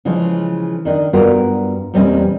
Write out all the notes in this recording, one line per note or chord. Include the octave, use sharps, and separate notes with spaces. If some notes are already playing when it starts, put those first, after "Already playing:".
C#3 E3 F3 G#3
D#3 D4 D#4
G2 B3 F4 F#4 A#4
E2 A#2 G3 C4 C#4 D#5